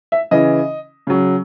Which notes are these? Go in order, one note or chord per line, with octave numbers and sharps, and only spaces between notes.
E5
C#3 E3 D#5
C#3 F#3